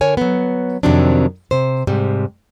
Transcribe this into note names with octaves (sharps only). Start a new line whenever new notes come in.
D3 A#4 C#5 G#5
F#3 B3
F2 C3 D#3 F#3 C4 D4
C3 C5
G#2 C3 G3